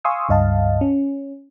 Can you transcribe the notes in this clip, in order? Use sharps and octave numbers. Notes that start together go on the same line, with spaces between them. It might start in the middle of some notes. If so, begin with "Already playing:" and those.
F5 G#5 C6 C#6 D#6 E6
C#2 G2 D#5 F5 A5
C#4